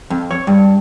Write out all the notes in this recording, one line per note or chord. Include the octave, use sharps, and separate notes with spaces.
F2
C#5
G2